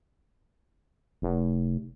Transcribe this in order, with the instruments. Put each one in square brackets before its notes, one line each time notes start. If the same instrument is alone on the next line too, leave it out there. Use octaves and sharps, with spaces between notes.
[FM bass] F1